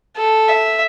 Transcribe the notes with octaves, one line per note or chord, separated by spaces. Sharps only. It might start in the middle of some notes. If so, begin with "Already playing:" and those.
A4
E5